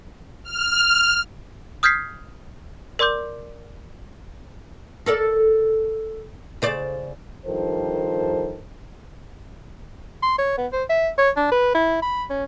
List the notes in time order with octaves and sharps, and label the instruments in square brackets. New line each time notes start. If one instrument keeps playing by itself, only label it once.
[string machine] F6
[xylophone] D#6 F6 G6 G#6 B6 C7
A#4 D5 C6 D6 G6
[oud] A4 A#4 D5
C#3 C5 D5
[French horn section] G2 D#3 F3 A4 A#4 C5
[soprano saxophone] C6
C#5
B3
C5
E5
C#5
D4
B4
E4
B5
C#4